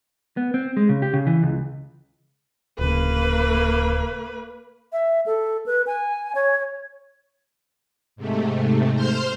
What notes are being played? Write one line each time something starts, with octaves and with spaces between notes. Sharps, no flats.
B3
C4
G#3
C#3
G4
C#3
E3
C#2
D1 C#3 A#3 B4
E5
A4
B4
G#5
C#5
G#2 C3 A3
C5 C6 F6 G6